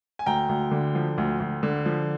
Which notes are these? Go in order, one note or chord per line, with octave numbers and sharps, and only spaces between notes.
G#5
D2 G5 A#5
D2
D3
F3
D2
D2
D3
F3